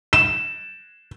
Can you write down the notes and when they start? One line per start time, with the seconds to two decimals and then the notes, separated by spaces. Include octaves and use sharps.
0.13 E7